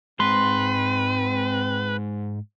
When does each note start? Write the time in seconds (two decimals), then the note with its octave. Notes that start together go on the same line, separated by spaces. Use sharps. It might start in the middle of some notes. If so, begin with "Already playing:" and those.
0.20 G#2 G#3 C4 B4 C6